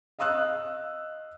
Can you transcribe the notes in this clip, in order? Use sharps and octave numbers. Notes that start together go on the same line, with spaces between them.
D#5 F5 D#6 E6 F#6